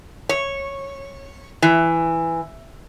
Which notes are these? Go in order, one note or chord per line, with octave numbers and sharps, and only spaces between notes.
C#5
E3